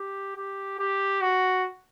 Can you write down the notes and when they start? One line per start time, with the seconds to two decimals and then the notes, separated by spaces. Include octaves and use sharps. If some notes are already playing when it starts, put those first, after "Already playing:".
Already playing: G4
0.37 G4
0.79 G4
1.21 F#4